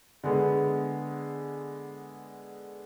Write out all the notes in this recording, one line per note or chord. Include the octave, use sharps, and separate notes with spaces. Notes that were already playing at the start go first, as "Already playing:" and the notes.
D3 G#3 B3